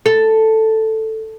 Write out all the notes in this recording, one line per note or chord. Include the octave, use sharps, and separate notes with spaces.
A4